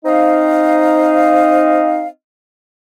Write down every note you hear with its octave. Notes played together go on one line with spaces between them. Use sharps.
C4 D#4 D#5 F5